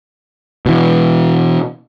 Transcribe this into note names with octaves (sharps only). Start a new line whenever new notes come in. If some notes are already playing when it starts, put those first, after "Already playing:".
B2 E3